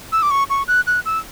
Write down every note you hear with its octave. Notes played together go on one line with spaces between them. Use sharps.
E6
D6
C#6
C#6
F#6
F#6
E6